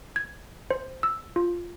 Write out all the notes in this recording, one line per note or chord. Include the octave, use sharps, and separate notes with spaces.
G#6
C5
E6
F4